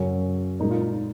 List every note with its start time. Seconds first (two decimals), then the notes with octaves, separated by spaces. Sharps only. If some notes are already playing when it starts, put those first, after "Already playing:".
Already playing: F#2 C#3 F#3 C#4
0.60 A#2 G#3 D#4
0.71 F4
0.82 D#4